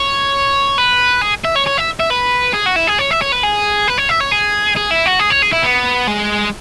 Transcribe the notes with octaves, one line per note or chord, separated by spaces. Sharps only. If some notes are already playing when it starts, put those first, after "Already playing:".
Already playing: C#5
B4
G#4
E5
C#5
C#5
E5
E5
B4
G#4
F#4
E4
G#4
C#5
E5
C#5
B4
G#4
B4
C#5
E5
C#5
G#4
G#4
E4
F#4
G#4
C#5
G#4
E4
B3
G#3